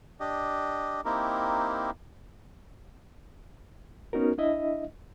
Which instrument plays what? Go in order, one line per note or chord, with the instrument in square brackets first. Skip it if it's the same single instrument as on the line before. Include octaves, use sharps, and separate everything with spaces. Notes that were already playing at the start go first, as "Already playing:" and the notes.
[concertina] D4 G4 D#5
A#3 C4 D#4 E4 G4 A#4
[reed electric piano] B3 C#4 D#4 F#4 A#4
D4 E4 D#5 E5